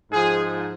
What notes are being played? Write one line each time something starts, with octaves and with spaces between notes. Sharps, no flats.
G#2 F3 G#4